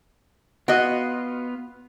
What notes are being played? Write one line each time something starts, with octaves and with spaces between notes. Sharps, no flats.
B3 F4 F#4 D#5